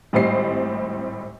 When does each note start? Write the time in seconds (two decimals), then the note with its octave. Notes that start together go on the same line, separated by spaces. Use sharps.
0.13 G#1 A2 G3 C4 D#5 C7